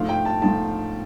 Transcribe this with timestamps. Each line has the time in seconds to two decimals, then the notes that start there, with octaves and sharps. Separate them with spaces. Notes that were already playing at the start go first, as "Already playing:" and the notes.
Already playing: G#2 F3 A3 F5
0.09 G5
0.25 A5
0.42 G#2 F3 A3 A5